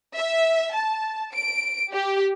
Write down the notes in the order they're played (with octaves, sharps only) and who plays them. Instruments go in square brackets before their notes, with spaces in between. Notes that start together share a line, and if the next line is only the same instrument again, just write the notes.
[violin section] E5
A5
D7
G4